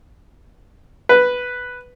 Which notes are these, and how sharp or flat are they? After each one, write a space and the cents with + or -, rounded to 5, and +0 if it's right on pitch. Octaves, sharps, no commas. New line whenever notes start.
B4 +0